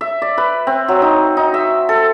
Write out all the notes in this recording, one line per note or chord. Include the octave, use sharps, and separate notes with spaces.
E5
D5
B4
C4
F#3
D#4
D#4
E5
A4